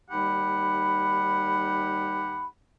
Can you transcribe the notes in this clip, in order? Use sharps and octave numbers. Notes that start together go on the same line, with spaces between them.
D#2 G3 D#4 G4 F#5 B5